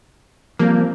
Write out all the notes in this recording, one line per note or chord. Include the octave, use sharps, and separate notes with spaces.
F3 G3 A#3 C4